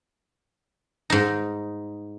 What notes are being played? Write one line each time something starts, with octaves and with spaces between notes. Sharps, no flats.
G#2 D#4